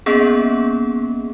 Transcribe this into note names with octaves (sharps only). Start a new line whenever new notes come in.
A#3 B3 C#4 G#4